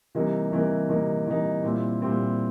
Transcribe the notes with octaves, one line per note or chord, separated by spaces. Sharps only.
C3 E3 G3 A#3 D#4
C3 E3 G3 A#3 D#4
C3 E3 G3 A#3 D#4
C3 E3 G3 A#3 D#4
A#2 G3 C4 E4
A#2 G3 C4 E4